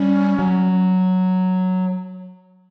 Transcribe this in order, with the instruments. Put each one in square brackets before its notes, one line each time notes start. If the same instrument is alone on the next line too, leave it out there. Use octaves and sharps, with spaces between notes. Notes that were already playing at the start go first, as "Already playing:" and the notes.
Already playing: [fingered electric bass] G3 [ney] C#4
[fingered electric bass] F#3